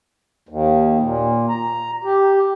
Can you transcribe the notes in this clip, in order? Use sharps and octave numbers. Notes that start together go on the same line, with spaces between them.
D#2
A#2
A#5
G4